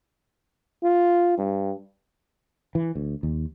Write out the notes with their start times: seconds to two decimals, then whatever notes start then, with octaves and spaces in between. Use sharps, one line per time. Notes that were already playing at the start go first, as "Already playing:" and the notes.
0.83 F4
1.38 G2
2.75 E3
2.95 D2
3.23 D#2